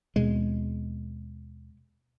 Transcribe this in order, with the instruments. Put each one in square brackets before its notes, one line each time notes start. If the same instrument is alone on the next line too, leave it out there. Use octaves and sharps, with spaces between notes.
[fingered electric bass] D#2 B2 C4 [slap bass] G#3